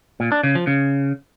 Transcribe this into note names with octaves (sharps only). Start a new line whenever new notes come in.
A#2
D4
C#3
F3
C#3